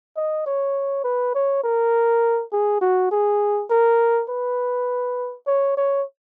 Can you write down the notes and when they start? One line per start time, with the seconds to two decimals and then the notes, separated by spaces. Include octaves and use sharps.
0.17 D#5
0.46 C#5
1.04 B4
1.35 C#5
1.64 A#4
2.53 G#4
2.81 F#4
3.11 G#4
3.70 A#4
4.29 B4
5.47 C#5
5.77 C#5